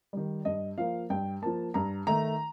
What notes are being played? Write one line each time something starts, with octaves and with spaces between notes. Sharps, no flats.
D#3 G3
G2 D#5
F3 A#3 F5
G2 G5
F3 A#3 A5
G2 A#5
D#3 A3 A#5